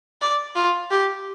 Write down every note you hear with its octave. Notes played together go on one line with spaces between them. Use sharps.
D5
F4
G4